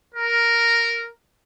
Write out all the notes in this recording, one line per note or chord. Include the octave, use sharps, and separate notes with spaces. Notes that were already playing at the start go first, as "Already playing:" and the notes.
A#4